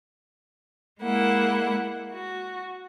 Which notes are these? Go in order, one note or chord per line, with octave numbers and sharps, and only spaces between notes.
G#3 A#3 E4 F#5
F#4